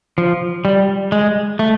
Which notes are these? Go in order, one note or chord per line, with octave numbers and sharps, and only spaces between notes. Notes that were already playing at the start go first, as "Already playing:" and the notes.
F3
G3
G#3
A3